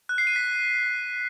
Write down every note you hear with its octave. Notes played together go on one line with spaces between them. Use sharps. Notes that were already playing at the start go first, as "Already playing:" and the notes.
F#6
C7
D#7
B6